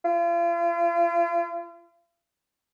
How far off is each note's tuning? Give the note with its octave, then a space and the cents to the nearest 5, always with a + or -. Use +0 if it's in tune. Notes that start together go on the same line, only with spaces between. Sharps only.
F4 -40